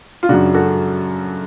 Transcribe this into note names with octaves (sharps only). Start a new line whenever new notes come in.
F4
F#2 C#3 D4 F#4
F#4 A4